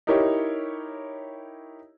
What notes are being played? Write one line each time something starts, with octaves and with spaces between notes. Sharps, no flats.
D#4 E4 G4 A#4 C#5